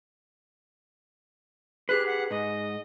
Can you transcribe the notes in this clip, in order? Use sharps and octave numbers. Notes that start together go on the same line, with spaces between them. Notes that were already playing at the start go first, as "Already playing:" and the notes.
G4 G#4 B4 F#6
F#5
G#2 D#5